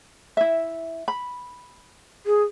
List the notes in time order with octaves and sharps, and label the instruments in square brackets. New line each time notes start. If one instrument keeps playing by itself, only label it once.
[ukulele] E4 E5
B5
[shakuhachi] G#4